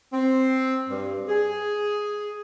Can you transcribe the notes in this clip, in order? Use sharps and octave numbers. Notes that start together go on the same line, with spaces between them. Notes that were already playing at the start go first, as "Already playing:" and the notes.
C4
G2
G#4